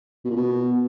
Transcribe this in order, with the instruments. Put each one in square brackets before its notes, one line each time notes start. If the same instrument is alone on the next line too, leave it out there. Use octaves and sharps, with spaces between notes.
[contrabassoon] B2
A#2
B2